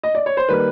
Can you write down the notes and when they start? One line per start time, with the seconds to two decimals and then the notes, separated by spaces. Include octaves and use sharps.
0.03 D#5
0.15 D5
0.26 C#5
0.37 C5
0.49 D#3 G3 A#3 B4